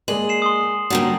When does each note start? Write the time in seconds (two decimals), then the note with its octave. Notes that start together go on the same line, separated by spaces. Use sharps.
0.08 G#3 A#3 G#4 D5 F#7
0.29 C7 E7
0.42 C6 D#6
0.90 A#2 D3 F#3 G3